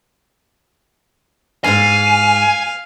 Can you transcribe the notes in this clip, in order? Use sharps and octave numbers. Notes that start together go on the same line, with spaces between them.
F2 G#2 F5 G#5